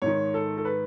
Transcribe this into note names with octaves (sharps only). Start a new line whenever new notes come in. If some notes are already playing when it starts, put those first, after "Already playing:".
G#2 D#3 C#5
A4
A4
B4